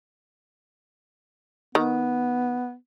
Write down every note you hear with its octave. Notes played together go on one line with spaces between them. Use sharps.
D#3 B3